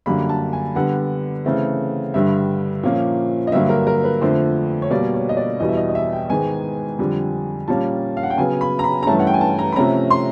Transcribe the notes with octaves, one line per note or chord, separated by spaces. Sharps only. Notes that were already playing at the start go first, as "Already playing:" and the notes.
F#2 D3 G3 A#3 B5
A5
G#5
D3 G3 B3 F#5
C#3 E3 A3 C4
G2 D3 G3 E5
A#2 F3 A#3 C#4
D#5
G2 D3 F#3 A#3 E5
A#4
A#4
B4
F2 D3 F3 A3 C5
C#5
B2 G3 A#3 D5
C#5
D#5
D5
E2 B2 G3 D#5
E5
D#5
D#5
E5
G5
G#2 D#3 G#3 B3 G#5
F2 D3 G3
A#2 G3 A#3 C#4 A5
F5
F#5
G5
C#3 F#3 B3 G#5
B5
A#5
B5
A#5
G2 E3 A3 C#4 A5
F#5
G5
G#5
A5
A#5
B5
C3 F3 A3 C#4 A#5
C6